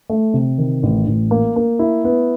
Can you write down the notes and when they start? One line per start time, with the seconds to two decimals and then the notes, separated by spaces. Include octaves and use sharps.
0.10 A3
0.34 C3
0.58 D#3
0.83 A1
1.08 A1
1.31 A#3
1.56 A#3
1.79 E4
2.04 B3